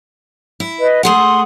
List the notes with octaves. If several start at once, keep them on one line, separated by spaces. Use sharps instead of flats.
E4
B4 D#5
A3 G#4 F#5 C6 D#6